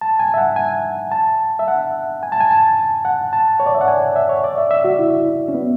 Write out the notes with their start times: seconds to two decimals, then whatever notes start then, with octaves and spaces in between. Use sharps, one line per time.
0.01 A5
0.19 G#5
0.34 E5
0.38 F#5
0.56 G#5
1.11 A5
1.59 E5
1.68 F#5
2.23 G#5
2.32 A5
2.41 G#5
2.51 A5
3.05 F#5
3.33 A5
3.60 C#5
3.66 D5
3.75 E5
3.81 F#5
3.88 G#5
4.16 E5
4.29 C#5
4.44 D5
4.58 E5
4.71 E5
4.84 F#4
4.99 E4
5.48 C#4
5.54 B3